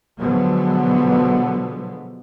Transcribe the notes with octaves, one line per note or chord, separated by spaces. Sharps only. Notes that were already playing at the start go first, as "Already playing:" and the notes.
B2 D3 F3 F#3 G#3 B3